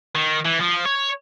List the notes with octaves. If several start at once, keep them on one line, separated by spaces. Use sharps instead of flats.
D#3
E3
F3
C#5